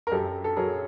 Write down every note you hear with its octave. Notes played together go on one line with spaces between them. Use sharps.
A#4
F#2 G4 A4
A4
F#3 G#4 A#4